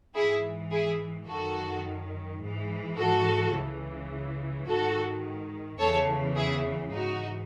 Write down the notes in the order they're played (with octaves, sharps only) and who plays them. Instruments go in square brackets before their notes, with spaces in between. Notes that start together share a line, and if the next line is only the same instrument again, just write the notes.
[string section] G#2 E3 E4 G#4
E4 G#4
F#2 D#3 F#4 A4
G#2 E3
F#4 A4
C#2 C#3 E3
G#2 D#3 F#4 A4
E2 C#3 E3 A4 C#5
E4 G#4
G#2 E3 D#4 F#4